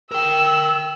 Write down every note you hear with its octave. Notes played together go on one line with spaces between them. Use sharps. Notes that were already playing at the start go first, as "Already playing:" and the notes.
A#4 G5 E6